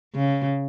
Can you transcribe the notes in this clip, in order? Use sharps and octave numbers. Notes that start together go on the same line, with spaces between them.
C#3